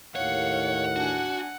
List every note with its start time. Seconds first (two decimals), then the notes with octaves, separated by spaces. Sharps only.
0.16 D#2 A2 C#5 F5 F#5
0.96 D4 F#4 G#5